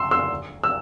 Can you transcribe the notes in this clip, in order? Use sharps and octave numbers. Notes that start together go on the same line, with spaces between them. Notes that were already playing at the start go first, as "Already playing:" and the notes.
Already playing: C6 E6
C6 E6
E6